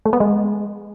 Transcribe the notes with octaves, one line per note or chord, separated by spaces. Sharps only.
A3
B3
G#3